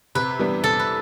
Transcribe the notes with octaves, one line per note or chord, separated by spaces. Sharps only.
C3 B4
E3 G3 B3 D4
C3 A4
B4